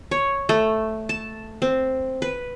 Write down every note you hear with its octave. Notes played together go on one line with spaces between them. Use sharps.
C#5
A3
A5
C4
B4